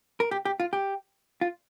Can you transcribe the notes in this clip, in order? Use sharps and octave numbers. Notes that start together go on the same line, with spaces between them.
A#4
G4
G4
F4
G4
F4